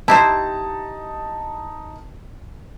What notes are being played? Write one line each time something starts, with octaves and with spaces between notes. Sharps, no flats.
D#4 E4 G4 C5 A5